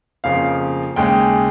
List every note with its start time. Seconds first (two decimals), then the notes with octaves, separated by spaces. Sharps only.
0.24 F2 C#3 F3 A#3 F5
0.96 D#2 C#3 G#3 G5